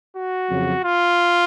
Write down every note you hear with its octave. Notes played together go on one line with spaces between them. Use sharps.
F#4
F2 C#3 F#3
F4